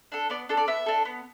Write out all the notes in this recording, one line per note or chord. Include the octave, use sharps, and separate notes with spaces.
D4 A4
B3 D5
D4 A4
D5
B3 E5
D4 A4
B3